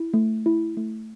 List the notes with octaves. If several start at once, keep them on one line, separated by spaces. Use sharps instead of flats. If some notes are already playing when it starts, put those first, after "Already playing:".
Already playing: E4
A3
E4
A3